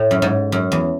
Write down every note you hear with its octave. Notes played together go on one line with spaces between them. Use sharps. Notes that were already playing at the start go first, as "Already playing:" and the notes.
Already playing: A2
F#2
G#2
F#2
E2